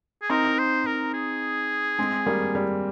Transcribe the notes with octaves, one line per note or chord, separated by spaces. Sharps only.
G#4
C4 D#4 A#4
C5
A#4
G#4
G#3 C4
G3 A#3
G3